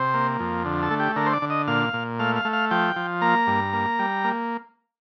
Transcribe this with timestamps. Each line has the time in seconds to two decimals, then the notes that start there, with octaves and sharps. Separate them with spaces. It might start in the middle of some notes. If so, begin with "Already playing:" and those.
Already playing: C3 C5
0.14 A#3
0.39 F2
0.65 D3
0.83 A4
0.91 A3
1.00 G4
1.16 D3 A#4
1.26 C5
1.33 D5
1.42 D3
1.50 D#5
1.68 A#2 F5
1.93 A#2
2.19 A3 F5
2.36 F5
2.45 A3
2.53 F5
2.71 F3 G5
2.96 F3
3.21 A#3 A#5
3.47 G2
3.73 A#3
3.99 G3
4.24 A#3